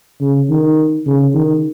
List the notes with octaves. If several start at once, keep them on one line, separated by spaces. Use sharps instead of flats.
C#3
D#3
C#3
D#3